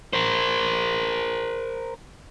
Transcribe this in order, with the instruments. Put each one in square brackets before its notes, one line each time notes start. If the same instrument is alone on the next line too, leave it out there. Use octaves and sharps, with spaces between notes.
[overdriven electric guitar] A#4 C5